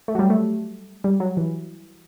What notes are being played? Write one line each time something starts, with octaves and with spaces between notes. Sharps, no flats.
A3
F#3
G3
A3
G3
F#3
E3